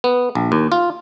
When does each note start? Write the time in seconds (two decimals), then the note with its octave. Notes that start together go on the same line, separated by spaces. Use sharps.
0.04 B3
0.35 A#1
0.52 D#2
0.72 F4